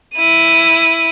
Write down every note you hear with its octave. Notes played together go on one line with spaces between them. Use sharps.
E4 D#7